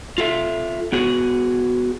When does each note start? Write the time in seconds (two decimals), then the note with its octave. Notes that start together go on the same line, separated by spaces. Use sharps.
0.18 F4 A4 E5
0.92 B3 F#4 G#4